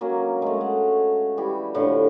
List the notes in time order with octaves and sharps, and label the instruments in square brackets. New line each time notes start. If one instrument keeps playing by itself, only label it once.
[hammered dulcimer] F#3 A#3 C#4
G#3 A3
F#5
E3 G3 G4
A2 D3 F3